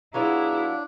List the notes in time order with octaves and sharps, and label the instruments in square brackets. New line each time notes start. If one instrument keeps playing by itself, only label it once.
[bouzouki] F#3 B3 F4 [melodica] D4 [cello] E4 [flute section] G#4 A#5